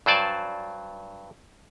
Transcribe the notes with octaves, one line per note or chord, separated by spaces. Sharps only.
G2 F#3 C5 D5 G#5 A5